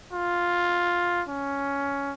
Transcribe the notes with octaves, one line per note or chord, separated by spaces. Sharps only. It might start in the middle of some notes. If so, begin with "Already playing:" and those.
F4
C#4